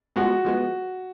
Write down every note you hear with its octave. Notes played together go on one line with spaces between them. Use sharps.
F3 G#3 B3 F#4
F3 G#3 B3